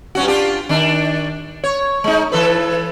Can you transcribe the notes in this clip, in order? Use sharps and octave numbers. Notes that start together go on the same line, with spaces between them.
G2 C#4 F#4
D4 F4 G4
D#3 D4
C#5
G#3 D#4
E3 A4 B4